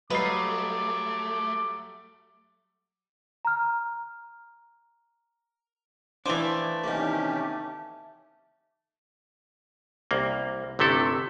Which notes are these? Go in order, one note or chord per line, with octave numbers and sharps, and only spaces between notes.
F#3 G3 A3 B4 D#5 F5 D6 C7
A#5 F6
E3 F3 A3 D4 G5 G#5 D6
C3 D#3 A#3 C#4 G4
C2 A#3
G1 C3 A3 E4 A4